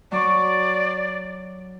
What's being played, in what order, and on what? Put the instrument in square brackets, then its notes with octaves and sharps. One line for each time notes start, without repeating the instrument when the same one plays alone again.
[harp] F#3 C#6 [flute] D5